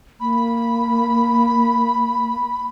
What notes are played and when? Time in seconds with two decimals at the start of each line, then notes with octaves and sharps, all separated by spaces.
0.20 A#3 B5